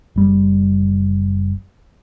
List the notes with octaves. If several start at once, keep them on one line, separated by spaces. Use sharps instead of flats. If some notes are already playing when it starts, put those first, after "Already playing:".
F#1 G3